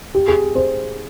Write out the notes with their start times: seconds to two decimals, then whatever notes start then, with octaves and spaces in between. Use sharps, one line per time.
0.15 G4
0.28 G#4
0.55 C5